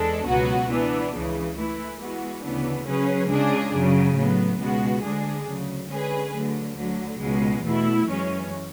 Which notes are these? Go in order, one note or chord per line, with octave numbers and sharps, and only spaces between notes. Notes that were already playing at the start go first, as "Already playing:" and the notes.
Already playing: E2 G#3 D4 A4
C#2 B2 F#3 B3 F#4
E3 B3 D4
C#2 C#3 E3
E3 A3 E4
E3 G#3 B3 F#4
D2 C#3 E3 B3 D4
C#3 F#3 C#4 G#4 B4
C#2 C#3 G#3 D4 G#4
F#2 C#3 F#3
A2 F#3 B3
C#2 B2 G#3 B3 F#4
D2 D3 G#3 D4 G#4
D2 C#3 F#3
D3 G#3 C#4 G#4 B4
D3 F#3 A3
D2 D3 F#3
C#2 B2 G#3
E2 B2 A3 E4
F#2 E3 G#3 C#4